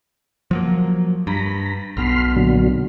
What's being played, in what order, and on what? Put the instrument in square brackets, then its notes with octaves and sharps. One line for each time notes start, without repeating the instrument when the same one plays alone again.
[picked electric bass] F3 F#3 A#3
[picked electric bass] G2 [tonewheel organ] A#5 B5
[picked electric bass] B1 B2 [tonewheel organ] B5 C6 F6
[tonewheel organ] A#2 D3 F#3